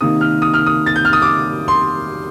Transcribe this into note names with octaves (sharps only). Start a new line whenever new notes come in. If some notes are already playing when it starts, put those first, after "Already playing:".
C3 D#3 A#3 D#4 D#6
F6
D#6
F6
D#6
A6
G6
F6
D#6
D6
C6